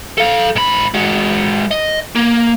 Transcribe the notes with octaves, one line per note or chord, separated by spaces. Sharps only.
A4 F5
G#2 B5
G#3 F#4
D#5
A#3